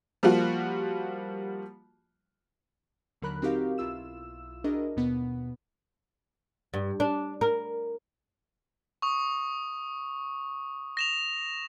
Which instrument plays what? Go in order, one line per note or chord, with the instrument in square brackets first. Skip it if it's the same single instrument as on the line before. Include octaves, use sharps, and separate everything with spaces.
[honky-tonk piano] F3 G3 A#3 F4 F#4
[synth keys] D#2 D3 F#3 A#4 B5 F#6
C4 D#4 F#4 G4 A#4 F5
B1 E4 F4 E6 E7
D4 E4 F#4 G#4 A#4 D#5
D#2 B2 B3
[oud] G2
D4
A#4
[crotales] C#6 D#6
A#6 E7 F7